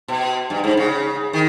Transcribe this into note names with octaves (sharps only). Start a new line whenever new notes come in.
B2
G2
G#2
C#3
D#3